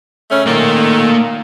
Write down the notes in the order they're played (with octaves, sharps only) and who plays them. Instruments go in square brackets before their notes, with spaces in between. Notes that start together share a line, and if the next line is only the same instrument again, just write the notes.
[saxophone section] C#3 A3 C#4
[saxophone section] D#3 A3 [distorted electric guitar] A#3 D5